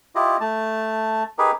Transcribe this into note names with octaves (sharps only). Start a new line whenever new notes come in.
E4 F4 G4 D#5
A3 A5
D#4 G4 G#4 A#4 B4